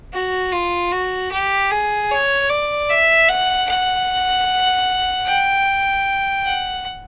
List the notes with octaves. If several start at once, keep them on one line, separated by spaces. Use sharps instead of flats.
F#4
F4
F#4
G4
G#4
C#5
D5
E5
F#5
F#5
G5
F#5